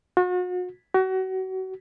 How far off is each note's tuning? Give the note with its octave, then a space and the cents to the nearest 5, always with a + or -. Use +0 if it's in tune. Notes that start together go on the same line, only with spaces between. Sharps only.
F#4 -40
F#4 +30